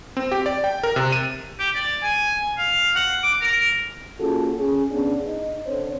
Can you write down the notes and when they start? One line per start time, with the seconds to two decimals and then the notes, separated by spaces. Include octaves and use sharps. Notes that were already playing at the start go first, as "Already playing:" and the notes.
0.17 C4
0.32 G4
0.46 D5
0.64 G5
0.83 A#4
0.96 C3
1.12 D#7
1.59 G4
1.75 D5
2.03 G#5
2.58 F5
2.96 F#5
3.23 D6
3.41 A#4
4.19 A#3 C#4 F4 F#4 G#4 A4
4.55 C#4 G#4
4.91 C#3 B3 D4
5.27 D#4
5.67 D3 C4 C5 C#5